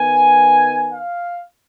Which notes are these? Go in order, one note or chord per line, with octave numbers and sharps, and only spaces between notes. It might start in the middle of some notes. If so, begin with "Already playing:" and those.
Already playing: D#3 B3 G#5
F5